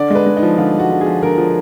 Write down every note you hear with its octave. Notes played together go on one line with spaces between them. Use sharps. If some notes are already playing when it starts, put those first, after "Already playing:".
Already playing: D3 D5
G#3 B4
G#3
D#4
F3
D3 F4
G#3
F#4
D3
G#4
F3
D3 A#4
F3